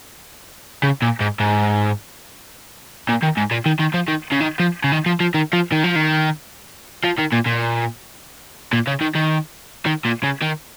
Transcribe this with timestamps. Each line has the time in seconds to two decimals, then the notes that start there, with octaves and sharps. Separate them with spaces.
0.83 C#3
1.02 A#2
1.21 G#2
1.40 G#2
3.09 A#2
3.23 D#3
3.37 G#2
3.51 A#2
3.66 D#3
3.80 D#3
3.94 F3
4.08 D#3
4.32 C#3
4.40 D#3
4.60 F3
4.84 C#3
4.92 D#3
5.06 F3
5.20 F3
5.35 D#3
5.53 F3
5.72 D#3
5.84 F3
5.96 D#3
7.04 F3
7.18 D#3
7.32 A#2
7.46 A#2
8.73 A#2
8.87 C#3
9.01 D#3
9.15 D#3
9.86 D#3
10.05 A#2
10.23 C#3
10.42 D#3